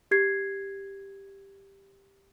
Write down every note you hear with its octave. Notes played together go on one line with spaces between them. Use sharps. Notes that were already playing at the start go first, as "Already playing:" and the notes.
G4 G#6 C7